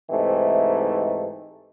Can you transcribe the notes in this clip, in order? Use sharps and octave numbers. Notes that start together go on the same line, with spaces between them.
G#2 C3 E3 A3 C4 D#4